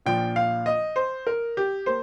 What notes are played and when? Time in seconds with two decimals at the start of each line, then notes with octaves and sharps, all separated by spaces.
0.06 A#1 A#2 F3 G5
0.36 F5
0.66 D#5
0.96 C5
1.27 A#4
1.57 G4
1.86 A#3 C5